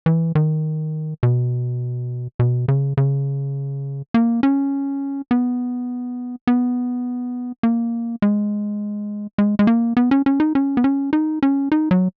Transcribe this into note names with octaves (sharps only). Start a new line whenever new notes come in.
E3
D#3
B2
B2
C#3
C#3
A#3
C#4
B3
B3
A#3
G#3
G#3
G#3
A#3
B3
C#4
C#4
D#4
C#4
B3
C#4
D#4
C#4
D#4
F#3